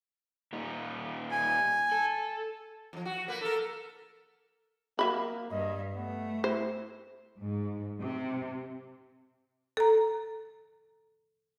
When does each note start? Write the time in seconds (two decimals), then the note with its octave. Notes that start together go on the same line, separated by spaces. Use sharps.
0.53 A#2 G3 D#4
1.31 G#5
1.92 A4
2.93 F2 F3
3.05 F#4
3.28 A#3 B4
3.41 A4 A#4
4.99 F#3 A#3 E5 B5
5.51 G2 D#5
5.94 A3 B3
6.44 E4 C5
7.41 G#2
8.02 C3
9.77 A4 A#5